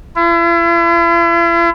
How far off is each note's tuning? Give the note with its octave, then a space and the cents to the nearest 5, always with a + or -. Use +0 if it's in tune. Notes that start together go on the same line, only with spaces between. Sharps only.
E4 +45